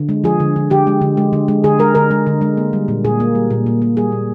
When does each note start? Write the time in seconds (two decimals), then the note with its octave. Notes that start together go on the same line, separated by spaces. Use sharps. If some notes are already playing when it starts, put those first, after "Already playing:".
Already playing: D3
0.09 G#3
0.24 F3 G#4
0.40 D3
0.56 D3
0.70 D3 G4
0.87 G#3
1.01 D3
1.17 G#3
1.33 D3
1.48 G#3
1.64 D3 G#4
1.79 G#3 A#4
1.95 D3 A#4
2.11 G#3
2.27 D3
2.41 G#3
2.57 A#3
2.73 G3
2.88 A#2
3.05 A#2 G#4
3.20 A#3
3.35 G3
3.50 A#2
3.67 A#2
3.82 A#3
3.97 G3 G#4
4.12 A#2